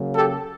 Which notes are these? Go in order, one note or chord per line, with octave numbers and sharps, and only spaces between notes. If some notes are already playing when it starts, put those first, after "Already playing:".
Already playing: C#3 F#3 A#3
G4 A4